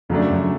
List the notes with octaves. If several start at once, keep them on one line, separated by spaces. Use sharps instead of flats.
F2 C#3 F#3 A3 D4
F#2